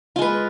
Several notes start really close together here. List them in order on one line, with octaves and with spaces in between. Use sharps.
F4 G#3 B4